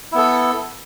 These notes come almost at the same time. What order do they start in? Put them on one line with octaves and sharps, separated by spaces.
E4 B3 A4